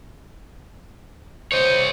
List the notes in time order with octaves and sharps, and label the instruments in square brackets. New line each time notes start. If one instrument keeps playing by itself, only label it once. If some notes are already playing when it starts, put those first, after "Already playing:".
[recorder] C5 [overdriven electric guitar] C#5 D#5